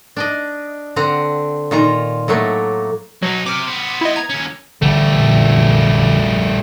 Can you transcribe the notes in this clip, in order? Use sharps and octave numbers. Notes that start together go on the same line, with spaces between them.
D4 D5 D#5
D3 C4 F#5 A#5
A#2 D#3 F4 A#5
A2 F#3 A3 A#3
B2 F#3 D#4
C3 D6 F6
B3 C5
E4 D#5
A#5 G#6
D#2 C#4
A1 D3 E3 G3 A3
F1 A#1 F#2